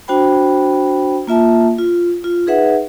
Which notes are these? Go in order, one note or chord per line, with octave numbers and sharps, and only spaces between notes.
D4 F#4 C5 G5 B5
A#3 F4 E5 A5
F4
F4
D#4 G#4 B4 E5 F#5